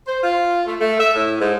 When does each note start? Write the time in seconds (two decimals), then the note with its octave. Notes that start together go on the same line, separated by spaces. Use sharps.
0.07 C5
0.23 F4
0.66 A3
0.81 A3
1.00 E5
1.15 A2
1.41 G#2